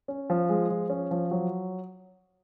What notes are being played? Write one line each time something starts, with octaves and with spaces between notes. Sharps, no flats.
C#4
F3
G#3
F3
C#4
F3
F#3